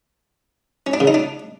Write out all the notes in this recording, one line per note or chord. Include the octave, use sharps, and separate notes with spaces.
C#4
D4
C#3
D#4
D4